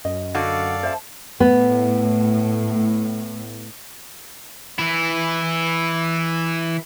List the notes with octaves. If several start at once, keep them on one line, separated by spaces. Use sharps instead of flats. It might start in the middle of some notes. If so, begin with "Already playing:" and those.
F#2 D#5
D3 F#4 A4 D5 F5
C5 E5 A5
A2 B3
E3 E4